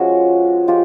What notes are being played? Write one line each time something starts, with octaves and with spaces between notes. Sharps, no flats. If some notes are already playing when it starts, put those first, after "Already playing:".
Already playing: F3 G#3 C#4 F#4 G#4
F3 G#3 F4 G4